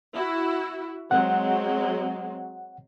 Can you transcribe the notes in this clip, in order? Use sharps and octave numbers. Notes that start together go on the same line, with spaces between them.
E4 F#4
F#3 G#3 C4 F#5